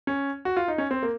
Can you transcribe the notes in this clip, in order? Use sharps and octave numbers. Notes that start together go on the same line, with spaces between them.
C#4
F#4
F4
D#4
C#4
C4
A#3